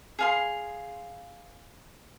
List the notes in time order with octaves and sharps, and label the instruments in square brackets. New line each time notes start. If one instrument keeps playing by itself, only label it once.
[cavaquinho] G#4 F5 C6